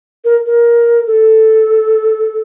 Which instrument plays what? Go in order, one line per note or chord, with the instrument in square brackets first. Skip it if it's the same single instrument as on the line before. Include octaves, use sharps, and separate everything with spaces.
[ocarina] A#4
A#4
A4